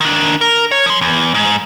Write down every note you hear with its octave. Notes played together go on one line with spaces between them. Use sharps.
D#3 D4
A#4
C#5
F3 C6
E2
G#2